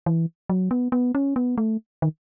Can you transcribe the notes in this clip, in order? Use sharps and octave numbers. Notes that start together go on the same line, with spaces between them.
E3
F#3
B3
B3
C#4
B3
A3
D#3